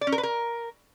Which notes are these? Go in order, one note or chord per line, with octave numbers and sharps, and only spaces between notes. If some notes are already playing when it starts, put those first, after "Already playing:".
D5
C#4
A#4
B4
A#4